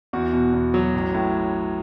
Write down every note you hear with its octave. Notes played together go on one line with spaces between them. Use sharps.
E2 F#4
B2
E2
F#3
A1
A2